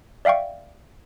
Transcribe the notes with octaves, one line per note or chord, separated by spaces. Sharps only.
D5 E5 F5 G5 C#6